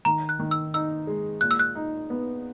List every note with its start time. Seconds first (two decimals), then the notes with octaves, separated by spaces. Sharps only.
0.05 D#3 A#5
0.29 F#6
0.39 D#3
0.51 E6
0.74 D#4 E6
1.07 G#3
1.41 A#2 F#6
1.51 E6
1.59 F#6
1.75 D#4
2.10 B3